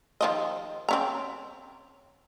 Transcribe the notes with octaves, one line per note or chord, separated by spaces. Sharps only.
D#3 F3 D#5
C4 C#4 A#5